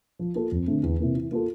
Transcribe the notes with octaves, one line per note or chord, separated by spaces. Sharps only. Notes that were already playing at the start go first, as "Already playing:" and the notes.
F3
A#3 F4 A4
F2
D3 A3 C4
E2
C3 E3 A#3
E3
A#3 F4 A4